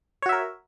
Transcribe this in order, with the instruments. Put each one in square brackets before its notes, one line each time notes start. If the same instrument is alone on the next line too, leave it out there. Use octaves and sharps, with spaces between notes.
[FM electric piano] C#5
F#4
E5
A#4